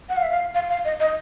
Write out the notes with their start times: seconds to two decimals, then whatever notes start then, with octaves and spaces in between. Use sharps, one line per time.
0.09 F#5
0.17 F5
0.23 E5
0.31 F5
0.55 F5
0.69 F5
0.85 D#5
1.00 D#5